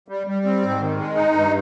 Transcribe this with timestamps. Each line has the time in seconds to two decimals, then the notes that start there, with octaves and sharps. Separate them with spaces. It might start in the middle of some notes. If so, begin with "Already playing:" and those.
0.08 G3
0.27 G3
0.45 C4
0.63 G#2
0.80 D#3
0.97 G#3
1.15 D#4
1.32 G2